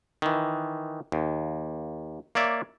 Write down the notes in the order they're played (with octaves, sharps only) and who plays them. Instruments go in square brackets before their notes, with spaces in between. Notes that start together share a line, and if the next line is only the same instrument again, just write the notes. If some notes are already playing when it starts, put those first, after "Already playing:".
[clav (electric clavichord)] D#3 E3
D#2
A#3 C#5 D5 E5